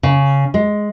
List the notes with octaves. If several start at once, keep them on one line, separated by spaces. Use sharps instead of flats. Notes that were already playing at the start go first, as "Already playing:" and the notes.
C#3
G#3